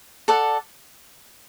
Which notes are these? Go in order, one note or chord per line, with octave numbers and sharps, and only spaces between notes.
A4 D5 F#5